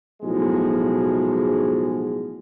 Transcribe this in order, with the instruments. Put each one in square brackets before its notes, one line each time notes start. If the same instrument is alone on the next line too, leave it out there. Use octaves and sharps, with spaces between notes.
[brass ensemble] B1 A2 F3 G#3 F#4 G#4